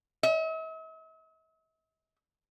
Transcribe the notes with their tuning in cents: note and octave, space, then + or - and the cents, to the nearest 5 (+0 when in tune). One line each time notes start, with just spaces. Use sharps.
E5 -45